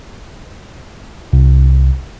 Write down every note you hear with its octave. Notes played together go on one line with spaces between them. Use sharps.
C2